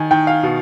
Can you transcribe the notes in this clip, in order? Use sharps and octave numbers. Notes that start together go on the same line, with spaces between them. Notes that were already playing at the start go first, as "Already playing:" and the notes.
Already playing: D#3 G#5
D#3 G5
F5
B2